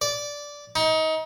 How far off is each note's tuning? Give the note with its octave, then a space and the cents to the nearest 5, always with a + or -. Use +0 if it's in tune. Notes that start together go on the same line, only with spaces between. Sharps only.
D5 -10
D#4 +25